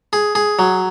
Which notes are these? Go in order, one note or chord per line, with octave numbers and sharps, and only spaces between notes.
G#4
G#4
F#3